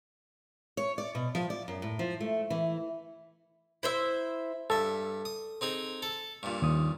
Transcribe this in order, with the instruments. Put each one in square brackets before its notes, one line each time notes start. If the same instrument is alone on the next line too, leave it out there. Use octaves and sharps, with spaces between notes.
[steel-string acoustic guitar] C#5
D5
B2
F3
D5
F#2
A2
F3
A3
E3
[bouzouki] E4 C5 E5
[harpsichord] G2 E5 [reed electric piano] A4
[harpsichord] D#6
C4 D#4 G#4
A4
G2 A#2
[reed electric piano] D#2 D#6